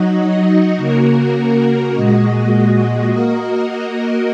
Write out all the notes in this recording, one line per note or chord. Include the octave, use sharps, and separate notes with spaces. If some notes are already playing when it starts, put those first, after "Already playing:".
Already playing: F#3 D#4 F#4 D#5
C#3 A#3 F#4 A#4
A#2 G#3 F#4 D#5
A#3 F#4 A#4 D#5